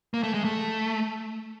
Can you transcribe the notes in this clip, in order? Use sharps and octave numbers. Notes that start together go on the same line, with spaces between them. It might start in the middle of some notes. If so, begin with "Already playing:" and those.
A#3
A3
G#3
A3